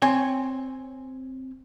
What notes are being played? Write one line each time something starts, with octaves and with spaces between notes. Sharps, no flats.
C4 C#5 G#5